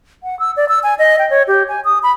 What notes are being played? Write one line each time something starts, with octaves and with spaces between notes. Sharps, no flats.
F#5
E6
D5
E6
G#5
D#5
G5
C#5
G4
G#5
D#6
B5